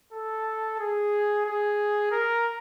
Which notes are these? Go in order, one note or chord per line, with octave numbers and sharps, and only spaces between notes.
A4
G#4
G#4
A#4